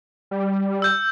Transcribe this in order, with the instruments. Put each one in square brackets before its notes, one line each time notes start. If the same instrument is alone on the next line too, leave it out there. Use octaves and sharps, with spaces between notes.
[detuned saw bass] G3
[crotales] E6 G6